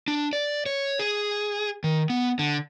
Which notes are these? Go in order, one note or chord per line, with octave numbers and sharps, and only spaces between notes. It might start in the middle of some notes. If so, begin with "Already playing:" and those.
D4
D5
C#5
G#4
D#3
B3
D3